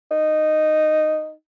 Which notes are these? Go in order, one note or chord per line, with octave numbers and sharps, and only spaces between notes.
D#4